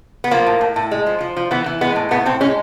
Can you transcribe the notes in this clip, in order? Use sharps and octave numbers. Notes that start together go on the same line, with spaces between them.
B3
F3 A#3
A2
A2
A2
G#3
F3
F3
F3
E3 B3
E3
G#3 B3
A2
A2 B3
A2 C4
G#3 C#4